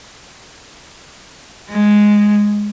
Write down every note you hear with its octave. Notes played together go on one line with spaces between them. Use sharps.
G#3